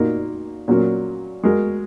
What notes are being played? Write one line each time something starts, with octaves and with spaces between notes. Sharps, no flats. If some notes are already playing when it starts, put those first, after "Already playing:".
Already playing: A#2 A#3 D#4 F#4 A#4
A#2 F#3 C#4 F#4 A#4
G#3 F#4 A#4